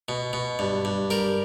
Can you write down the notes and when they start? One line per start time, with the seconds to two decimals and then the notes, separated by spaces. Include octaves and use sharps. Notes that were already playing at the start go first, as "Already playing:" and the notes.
0.09 B2
0.33 B2
0.59 G2
0.85 G2
1.10 G3 A#4